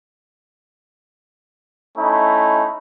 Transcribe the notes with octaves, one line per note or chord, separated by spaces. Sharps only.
A3 C#4 D#4 E4